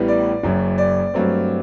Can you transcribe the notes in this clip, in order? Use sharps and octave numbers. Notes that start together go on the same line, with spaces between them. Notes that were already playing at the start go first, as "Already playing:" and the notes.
Already playing: A1 A2 G3 B3
D5
F#1 F#2 F#3
D5
G2 F#3 A3 C4